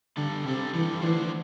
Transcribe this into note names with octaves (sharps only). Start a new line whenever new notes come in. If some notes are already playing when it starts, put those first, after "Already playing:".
D3 G3 D4 A4
C3 G3 D4 A4
E3 G3 D4 A4
D3 E3 A3 D4 C5